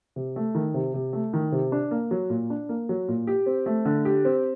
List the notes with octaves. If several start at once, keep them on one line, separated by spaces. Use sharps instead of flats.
C3
A3
D#3
C3
C3
A3
D#3
C3
D4
A#3
F#3
A#2
D4
A#3
F#3
A#2
G4
C4
A3
D3
G4
C4